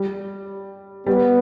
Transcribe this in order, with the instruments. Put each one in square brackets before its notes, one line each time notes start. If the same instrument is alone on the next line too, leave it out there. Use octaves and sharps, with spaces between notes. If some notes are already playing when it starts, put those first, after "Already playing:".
Already playing: [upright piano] G3
[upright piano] G3 [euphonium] B3